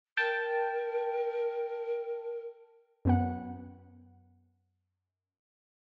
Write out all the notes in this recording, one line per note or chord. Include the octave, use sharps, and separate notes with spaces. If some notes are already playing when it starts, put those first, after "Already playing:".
A#4 G5 A5
F#2 B3 F#5